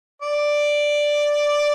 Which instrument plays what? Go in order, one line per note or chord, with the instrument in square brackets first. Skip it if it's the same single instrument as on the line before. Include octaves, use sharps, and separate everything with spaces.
[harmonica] D5